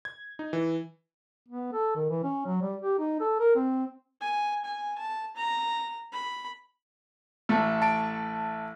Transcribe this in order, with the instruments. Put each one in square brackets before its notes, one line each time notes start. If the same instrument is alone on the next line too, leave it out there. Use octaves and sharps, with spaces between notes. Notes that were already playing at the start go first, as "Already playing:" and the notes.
[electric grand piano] G#6
D#4
E3
[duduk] B3
A4
D#3
E3
C#4
F#3
G3
G4
D#4
A4
A#4
C4
[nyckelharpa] G#5
G#5
A5
A#5
B5
[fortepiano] A1 A3 A4
[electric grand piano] A5 D7